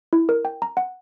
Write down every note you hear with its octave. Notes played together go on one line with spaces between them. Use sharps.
E4
A#4
G5
A#5
F#5